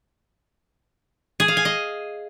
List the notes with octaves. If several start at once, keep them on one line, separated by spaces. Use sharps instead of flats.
G#4
F5
G#5
D#5